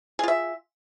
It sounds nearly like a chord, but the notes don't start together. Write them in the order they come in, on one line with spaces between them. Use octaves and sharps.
G#4 F4 E5